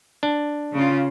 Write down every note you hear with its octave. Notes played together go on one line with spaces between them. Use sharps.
D4
C#3 F4